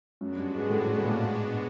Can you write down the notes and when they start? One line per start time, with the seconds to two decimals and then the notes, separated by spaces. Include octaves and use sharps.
0.21 F#2 G#3 B3 D4 F#4
0.37 G2
0.54 G#2
0.70 A2
0.86 A2
0.98 A2
1.04 A#2
1.21 G#2